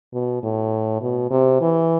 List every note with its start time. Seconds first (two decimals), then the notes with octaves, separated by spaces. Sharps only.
0.13 B2
0.43 A2
1.01 B2
1.30 C3
1.61 E3